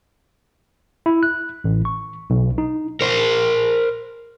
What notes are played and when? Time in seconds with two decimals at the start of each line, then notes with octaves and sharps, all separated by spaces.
1.06 E4
1.23 F#6
1.64 A1
1.85 C#6
2.30 B1
2.58 D#4
3.01 A#4 C5